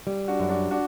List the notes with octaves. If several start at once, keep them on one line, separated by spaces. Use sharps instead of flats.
G3
D4 F#4
F#2
D4 F#4
D4 F#4